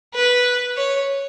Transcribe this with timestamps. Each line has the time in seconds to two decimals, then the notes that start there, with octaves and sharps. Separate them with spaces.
0.14 B4
0.77 C#5